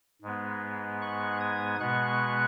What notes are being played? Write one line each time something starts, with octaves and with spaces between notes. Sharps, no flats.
G#2 G#3 B3
C#6 F#6
D#6 G#6
B2 G#3 B3 C#6 F#6